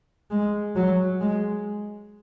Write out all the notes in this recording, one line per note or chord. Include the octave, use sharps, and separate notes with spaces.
G#3
F#3
G#3